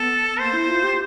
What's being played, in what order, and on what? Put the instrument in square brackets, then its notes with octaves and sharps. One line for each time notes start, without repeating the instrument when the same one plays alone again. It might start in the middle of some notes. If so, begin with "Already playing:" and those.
Already playing: [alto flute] B3 [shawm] A4
[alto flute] A#3 [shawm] C5
[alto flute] E4
F4
G4